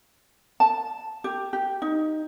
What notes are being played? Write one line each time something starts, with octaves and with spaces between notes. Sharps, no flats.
A5
G4
G4
D#4